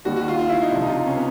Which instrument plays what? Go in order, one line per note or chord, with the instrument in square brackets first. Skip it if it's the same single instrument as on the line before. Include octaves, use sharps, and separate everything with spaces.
[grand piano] D#2 D#3 G3 [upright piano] F#4
[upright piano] F#4
F4
F4
E4
D#4
[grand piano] C#2 C3 F3 [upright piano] D4
[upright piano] D#4
F4
D#4
C#4
B3